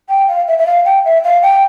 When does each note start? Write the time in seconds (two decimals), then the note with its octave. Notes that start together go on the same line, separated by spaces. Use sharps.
0.09 G5
0.28 F5
0.48 E5
0.59 E5
0.66 F5
0.85 G5
1.05 E5
1.24 F5
1.43 G5